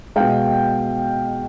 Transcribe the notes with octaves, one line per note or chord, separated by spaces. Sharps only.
B2 G#3 F5 G5